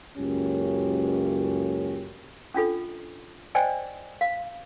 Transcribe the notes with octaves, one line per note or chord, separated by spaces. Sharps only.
C#2 F#2 A#3 C#4 G4
C#4 D4 F4 A4
C5 D5 D#5 G5 G#5
F5